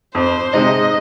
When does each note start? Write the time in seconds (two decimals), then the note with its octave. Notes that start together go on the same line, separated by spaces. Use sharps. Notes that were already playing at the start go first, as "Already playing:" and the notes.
0.15 F2 C5
0.53 C3 G#3 D#4 D#5